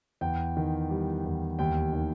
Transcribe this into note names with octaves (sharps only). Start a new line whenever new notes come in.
E2 G5
D#3
G3
E2
D#2 G5
D#3